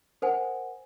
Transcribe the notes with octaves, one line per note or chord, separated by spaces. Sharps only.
A#4 C5 F#5 G#5